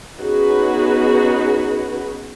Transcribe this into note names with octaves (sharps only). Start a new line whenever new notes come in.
B3 C#4 D#4 F#4 G#4 B4